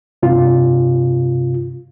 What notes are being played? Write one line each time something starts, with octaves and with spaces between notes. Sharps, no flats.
G2 C3 F4